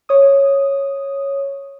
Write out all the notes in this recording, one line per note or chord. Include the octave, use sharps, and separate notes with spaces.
C#5 D#6